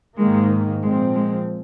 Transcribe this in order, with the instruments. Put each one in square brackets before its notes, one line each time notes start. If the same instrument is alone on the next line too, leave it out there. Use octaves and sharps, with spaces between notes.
[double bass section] G#2 D#3 A#3 [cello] G#3
[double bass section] A#2 F3 C4 [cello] G#3
[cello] G#3